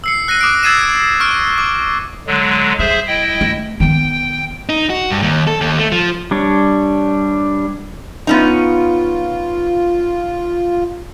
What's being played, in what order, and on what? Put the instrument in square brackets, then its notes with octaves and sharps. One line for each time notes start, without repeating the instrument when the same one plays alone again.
[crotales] E6 C7 C#7
F#6 A#6 C7 D#7
D6 D#6 F#6 C7 D7
E6 G#6 A6 C7 D#7 E7
C#6 F6 F#6 D7
D6
[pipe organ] D3 F#3 G#3
[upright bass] G3 [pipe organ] G#4 C5 E5
[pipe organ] E4 D#5 G5
[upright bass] A3
[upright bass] D#3 B3 [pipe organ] G5
[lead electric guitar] D#4
F#4
G2
D#2
A4
D#2
A3
F3
[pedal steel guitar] G3 D4 C#5
[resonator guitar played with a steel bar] B3 C#4 D#4 [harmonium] F4